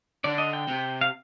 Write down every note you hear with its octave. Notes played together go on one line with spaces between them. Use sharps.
D3 D5
D#5
G5
C3
F5